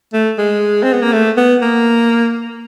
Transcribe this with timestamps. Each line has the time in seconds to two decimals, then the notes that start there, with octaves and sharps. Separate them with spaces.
0.13 A3
0.38 G#3
0.83 C4
0.93 B3
1.02 A#3
1.13 A3
1.37 B3
1.62 A#3